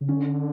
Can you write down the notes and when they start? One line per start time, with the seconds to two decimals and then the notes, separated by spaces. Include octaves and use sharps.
0.01 C#3
0.09 D3 C#4